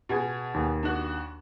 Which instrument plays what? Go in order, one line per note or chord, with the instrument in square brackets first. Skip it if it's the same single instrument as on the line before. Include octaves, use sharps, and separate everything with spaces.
[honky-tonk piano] B2 G#4 G#6
[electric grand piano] D#2
[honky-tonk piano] D4 F#4